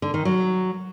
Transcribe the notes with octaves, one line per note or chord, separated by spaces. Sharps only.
D3
D#3
F#3